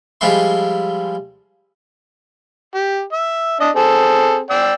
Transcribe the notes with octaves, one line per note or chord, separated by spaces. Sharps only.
F3 G3 G#3 E4 C6
G4
E5
D4 D#5
C4 G#4 A4
D5 G5 E6